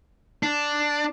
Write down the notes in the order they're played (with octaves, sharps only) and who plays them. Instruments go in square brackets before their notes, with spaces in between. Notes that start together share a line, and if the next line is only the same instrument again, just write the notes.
[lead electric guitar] D4